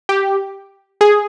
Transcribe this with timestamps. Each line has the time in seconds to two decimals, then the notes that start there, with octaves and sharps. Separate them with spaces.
0.09 G4
1.01 G#4